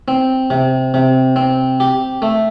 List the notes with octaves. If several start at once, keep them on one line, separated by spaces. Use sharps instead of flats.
C4
C3
C3
C4
G4
A3